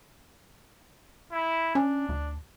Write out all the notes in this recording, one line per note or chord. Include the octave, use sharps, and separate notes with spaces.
E4
C#4 D4
D2